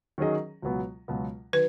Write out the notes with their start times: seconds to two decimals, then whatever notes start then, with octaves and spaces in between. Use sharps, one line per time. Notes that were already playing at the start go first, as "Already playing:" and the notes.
0.18 D#3 F#3 C#4 G#4 D#5
0.62 C#2 B2 F#3 B3
1.08 C#2 B2 F#3 B3
1.53 D#3 F#3 B4